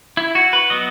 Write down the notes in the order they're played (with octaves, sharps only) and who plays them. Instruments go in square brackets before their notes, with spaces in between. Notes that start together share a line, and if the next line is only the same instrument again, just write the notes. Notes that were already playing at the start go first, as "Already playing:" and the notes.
[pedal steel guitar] E4
F#4
B4
F#3 B3 D#5